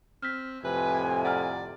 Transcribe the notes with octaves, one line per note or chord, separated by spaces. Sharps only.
C4 F6 B6
F2 A2 C3 B4 G#5
D5 F#5 A#5 F6